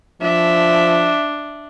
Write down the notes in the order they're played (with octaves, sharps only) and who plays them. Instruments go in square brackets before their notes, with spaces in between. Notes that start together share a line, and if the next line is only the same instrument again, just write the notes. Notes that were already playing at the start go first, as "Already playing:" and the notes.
[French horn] F3 [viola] D4 [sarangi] E5